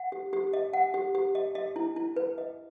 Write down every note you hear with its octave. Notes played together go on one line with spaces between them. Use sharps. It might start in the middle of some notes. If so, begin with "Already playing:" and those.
Already playing: F#5
G4
G4
D#5
F#5
G4
G4
D#5
D#5
E4
E4
B4
D#5